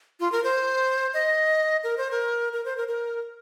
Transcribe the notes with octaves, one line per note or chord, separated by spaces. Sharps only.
F4
A#4
C5
D#5
A#4
C5
A#4
A#4
C5
A#4
A#4